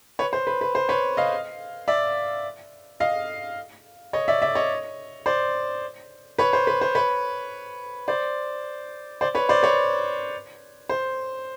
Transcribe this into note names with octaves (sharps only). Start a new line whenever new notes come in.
B4 C#5
C5
B4
B4
C5
B4 C#5
D#5 F5
D5 E5
D#5 F5
C#5 D#5
D5 E5
D5 E5
C#5 D#5
C5 D5
B4 C#5
C5
B4
C5
B4 C#5
C5 D5
C5 D5
B4 C#5
C5 D5
B4 C#5
C5